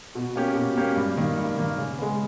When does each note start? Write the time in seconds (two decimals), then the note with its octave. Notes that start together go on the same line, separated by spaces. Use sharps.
0.15 B2
0.36 A#3 C#4 G4
0.56 B2
0.76 A#3 C#4 G4
0.96 G2
1.17 D#3 A#3
1.38 G2
1.58 D#3 A#3
1.78 C#3
1.98 G#3 B3